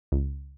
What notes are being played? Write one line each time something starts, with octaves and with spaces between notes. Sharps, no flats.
C#2